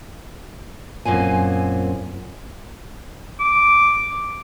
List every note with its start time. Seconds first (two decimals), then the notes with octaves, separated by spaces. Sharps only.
1.05 F#2 A#2 C4 G#5
3.40 D6